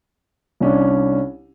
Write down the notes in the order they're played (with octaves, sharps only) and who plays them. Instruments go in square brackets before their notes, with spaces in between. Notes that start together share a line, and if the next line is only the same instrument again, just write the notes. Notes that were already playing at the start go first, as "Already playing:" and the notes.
[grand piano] C2 C#4 D4